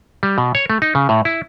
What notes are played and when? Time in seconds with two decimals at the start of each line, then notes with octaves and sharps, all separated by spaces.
0.23 G3
0.38 B2
0.55 C#5
0.70 A3
0.82 D#4
0.95 C#3
1.09 A2
1.25 E4